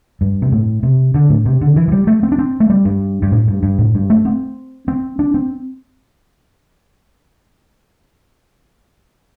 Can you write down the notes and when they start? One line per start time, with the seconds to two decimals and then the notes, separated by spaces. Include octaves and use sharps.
0.21 G2
0.42 C3
0.52 A2
0.83 C3
1.14 D3
1.30 A2
1.45 C3
1.61 D3
1.76 E3
1.88 E3
1.92 G3
2.07 A3
2.23 C4
2.32 D4
2.38 C4
2.60 A3
2.70 G3
2.85 G2
3.22 G2
3.32 A2
3.48 G2
3.63 G2
3.79 A2
3.94 G2
4.10 A3
4.25 C4
4.88 C4
5.19 D4
5.34 C4